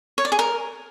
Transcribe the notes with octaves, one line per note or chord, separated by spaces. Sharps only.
C#5
D5
G#4
A#4